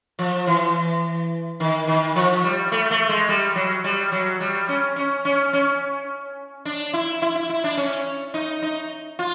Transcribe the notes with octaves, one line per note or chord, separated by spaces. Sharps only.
F3
E3
D#3
D#3
F3
G3
A3
A3
G#3
G3
F#3
G3
F#3
G3
C#4
C#4
C#4
C#4
D4
E4
E4
E4
E4
D4
C#4
D#4
D#4
F4